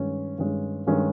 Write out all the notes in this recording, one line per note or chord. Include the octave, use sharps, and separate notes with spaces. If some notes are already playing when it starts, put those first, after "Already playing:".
Already playing: G2 D#3 G#3 C#4
G2 D#3 G#3 C#4
G2 D#3 G#3 C#4